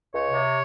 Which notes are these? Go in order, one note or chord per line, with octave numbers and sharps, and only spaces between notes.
C#2 C#5
C3